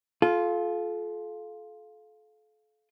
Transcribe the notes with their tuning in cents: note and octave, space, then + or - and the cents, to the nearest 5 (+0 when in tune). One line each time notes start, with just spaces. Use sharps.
F4 +5 A4 -35